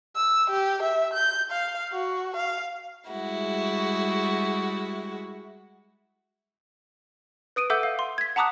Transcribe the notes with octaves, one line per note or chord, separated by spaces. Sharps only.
E6
G4
E5
G6
F5
F#4
F5
G3 G#3 E4 F#4
B4 D#6 D7 D#7
A4 E5 F#5 D6 E6 G6
F5
C6
G#6 B6
F#5 A5 A#5 D6 D#6 F#6